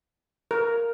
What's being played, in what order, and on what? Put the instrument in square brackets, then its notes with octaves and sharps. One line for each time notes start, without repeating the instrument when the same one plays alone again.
[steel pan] A#4